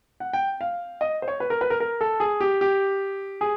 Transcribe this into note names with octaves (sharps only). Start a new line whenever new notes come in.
F#5
G5
F5
D#5
C5
C#5
B4
A#4
B4
A#4
A#4
A4
G#4
G4
G4
G#4